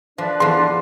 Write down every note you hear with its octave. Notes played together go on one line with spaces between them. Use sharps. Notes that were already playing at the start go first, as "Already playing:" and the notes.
F3 D4 B4 D5
E2 F3 C6